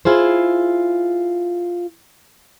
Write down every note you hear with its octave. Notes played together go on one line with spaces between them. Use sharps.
E4 F4 G#4 C5